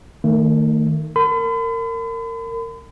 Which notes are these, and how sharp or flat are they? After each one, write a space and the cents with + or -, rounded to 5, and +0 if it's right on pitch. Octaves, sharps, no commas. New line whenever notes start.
D#3 -5 A3 +30
A#4 -25 B5 +45